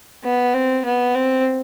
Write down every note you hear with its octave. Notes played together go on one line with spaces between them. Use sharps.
B3
C4
B3
C4